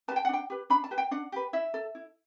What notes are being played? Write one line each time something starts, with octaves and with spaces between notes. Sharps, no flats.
G4 B4 A5
G5
F#5
D4 G5
G4 B4
D4 B5
A5
G4 B4
G5
D4 F#5
G4 B4
E4 E5
A4
E4